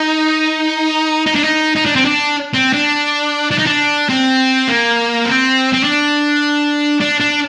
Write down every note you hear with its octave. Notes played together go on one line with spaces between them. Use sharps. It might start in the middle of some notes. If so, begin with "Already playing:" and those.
Already playing: D#4
D#4
D4
D#4
D#4
D4
C4
D4
C4
D4
D4
D#4
D4
C4
A#3
C4
C4
D4
D4
D4